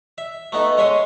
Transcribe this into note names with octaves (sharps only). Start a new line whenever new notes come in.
E5
A3 B3 D#4 A4
G#3 C#5 E5 C6 D#6